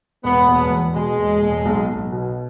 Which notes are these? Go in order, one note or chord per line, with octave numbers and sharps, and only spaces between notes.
E1 B3
E1
E2
B2 G#3
E1
E1
B1
B1
B2